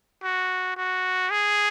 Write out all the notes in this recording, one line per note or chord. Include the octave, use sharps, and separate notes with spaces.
F#4
F#4
G#4